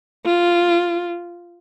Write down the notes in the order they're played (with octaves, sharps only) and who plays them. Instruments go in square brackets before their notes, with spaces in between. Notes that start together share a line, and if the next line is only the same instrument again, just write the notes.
[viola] F4